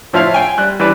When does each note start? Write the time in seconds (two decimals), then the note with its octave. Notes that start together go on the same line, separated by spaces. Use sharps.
0.13 A2 F3 E4 C#5 F5
0.34 G5 G#5
0.58 G3 F#6
0.80 E3 G3 D4 B4